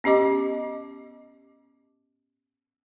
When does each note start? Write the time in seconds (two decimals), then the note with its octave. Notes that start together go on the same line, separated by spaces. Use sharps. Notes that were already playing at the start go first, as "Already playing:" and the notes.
0.04 B3 C#4 G4 D#5 D6